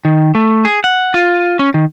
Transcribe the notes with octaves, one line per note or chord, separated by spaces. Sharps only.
D#3
A3
G#4
F#5
F4
C#4
D#3